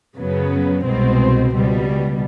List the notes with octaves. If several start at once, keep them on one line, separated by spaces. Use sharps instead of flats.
F#2 C#3 F#3 B3
C2 B2 G#3 C4
C#2 B2 G3